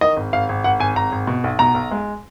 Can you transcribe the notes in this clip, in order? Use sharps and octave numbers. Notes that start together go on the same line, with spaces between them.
D#3 D#5
G#1
G#1 F5
G#1
G#1 F#5
G#1 G#5
G#1 A#5
G#1
B2
B1
B2 A#5
B1
G#3